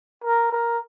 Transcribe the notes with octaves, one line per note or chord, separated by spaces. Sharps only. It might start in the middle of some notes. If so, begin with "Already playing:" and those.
A#4
A#4